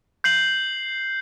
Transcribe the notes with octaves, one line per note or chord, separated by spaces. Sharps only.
G6 C7 F#7